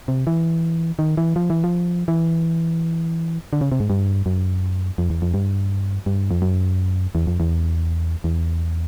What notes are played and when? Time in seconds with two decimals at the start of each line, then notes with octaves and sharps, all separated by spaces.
0.08 C3
0.27 E3
0.99 D#3
1.17 E3
1.36 F3
1.50 E3
1.64 F3
2.08 E3
3.53 D3
3.61 C#3
3.72 C3
3.80 G#2
3.90 G2
4.26 F#2
4.98 F2
5.10 E2
5.22 F2
5.34 G2
6.06 G2
6.31 F2
6.42 F#2
7.15 E2
7.27 F2
7.40 E2
8.24 E2